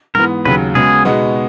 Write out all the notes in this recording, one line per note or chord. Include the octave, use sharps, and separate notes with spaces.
G#2 E3 B3 A#4
D#2 C#3 F#3 B4
C#3 G#3 B3 F#4 G#4
B2 G#3 B3 D#4 F#4